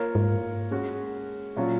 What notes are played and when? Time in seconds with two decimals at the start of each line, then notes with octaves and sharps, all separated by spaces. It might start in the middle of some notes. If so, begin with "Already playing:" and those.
Already playing: A#3 F4 A#4 C#5
0.15 G#2
0.71 G#3 C#4 F#4
1.56 A#2 F#3 C#4 F4